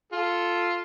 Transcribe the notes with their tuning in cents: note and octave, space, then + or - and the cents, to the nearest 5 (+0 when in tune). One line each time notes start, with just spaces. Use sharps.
F4 +0 A4 +0